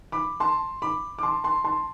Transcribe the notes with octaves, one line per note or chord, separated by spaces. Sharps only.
B5 D6
A5 C6
B5 D6
D6
A5 C6
A5 C6
A5 C6